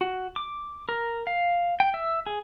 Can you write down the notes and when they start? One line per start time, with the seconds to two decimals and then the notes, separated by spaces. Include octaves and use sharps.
0.01 F#4
0.36 D6
0.89 A#4
1.27 F5
1.80 G5
1.94 E5
2.26 G#4